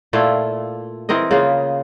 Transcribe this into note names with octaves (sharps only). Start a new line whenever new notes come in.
A#2 A3 E4 F4
E3 C4 A#4 D#5
C#3 A#3 F4